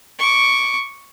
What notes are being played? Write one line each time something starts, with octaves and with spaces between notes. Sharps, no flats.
C#6 D6